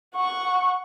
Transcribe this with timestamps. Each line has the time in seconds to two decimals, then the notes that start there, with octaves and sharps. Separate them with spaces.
0.16 F#5 C#6